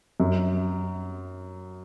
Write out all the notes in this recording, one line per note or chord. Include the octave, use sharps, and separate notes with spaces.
F#2